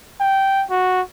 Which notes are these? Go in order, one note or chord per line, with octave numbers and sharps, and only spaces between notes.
G5
F#4